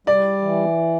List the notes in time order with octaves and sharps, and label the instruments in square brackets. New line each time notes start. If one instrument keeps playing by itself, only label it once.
[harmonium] G3 [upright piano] D5
[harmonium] E3